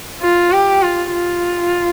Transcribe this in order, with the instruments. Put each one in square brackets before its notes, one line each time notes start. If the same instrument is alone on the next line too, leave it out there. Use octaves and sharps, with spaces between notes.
[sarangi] F4
G4
F4
F4